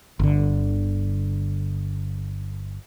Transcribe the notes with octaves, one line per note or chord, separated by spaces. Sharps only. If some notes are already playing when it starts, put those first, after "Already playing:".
G1 D3